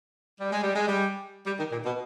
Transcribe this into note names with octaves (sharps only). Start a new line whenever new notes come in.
G3
G#3
G3
G#3
G3
G3
D#3
A#2
B2